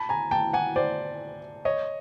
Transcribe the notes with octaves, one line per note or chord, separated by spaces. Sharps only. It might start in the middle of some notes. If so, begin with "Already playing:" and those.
Already playing: A5 B5
G#5 A#5
G5 A5
F#5 G#5
C5 D5
C#5 D#5